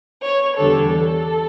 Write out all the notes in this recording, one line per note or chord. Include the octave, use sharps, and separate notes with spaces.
C#5
E2 D3 G3 D4 A4
A4